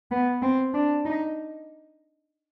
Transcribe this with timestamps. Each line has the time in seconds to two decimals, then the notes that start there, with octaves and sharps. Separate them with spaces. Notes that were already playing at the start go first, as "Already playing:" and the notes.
0.11 B3
0.42 C4
0.74 D4
1.05 D#4